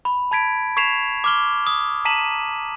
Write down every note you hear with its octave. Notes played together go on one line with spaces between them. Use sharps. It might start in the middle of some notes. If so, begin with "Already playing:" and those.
B5
A5 B5 G#6 B6 D7
C#6 G#6 B6 C7 E7 F7
D6 F6 G7
D#6
A5 A#5 B6 D#7 E7 F#7